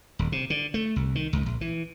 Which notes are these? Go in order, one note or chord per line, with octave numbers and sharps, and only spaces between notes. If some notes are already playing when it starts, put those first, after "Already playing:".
D#1
C3
D3
A3
C2
D#3
C#2
A#1
E3